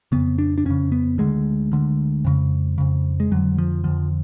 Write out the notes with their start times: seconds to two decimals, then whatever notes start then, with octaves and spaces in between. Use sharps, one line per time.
0.12 F2 C#3 B3
0.38 D4
0.58 D4
0.65 F2 C#3 C#4
0.92 B3
1.18 D2 D3 G#3
1.72 D2 D3
2.25 F2 C#3
2.78 F2 C#3
3.20 G#3
3.31 F2 D3 F#3
3.58 F3
3.84 F2 D3 F3